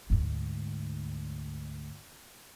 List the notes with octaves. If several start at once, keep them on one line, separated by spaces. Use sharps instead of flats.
D2 G#2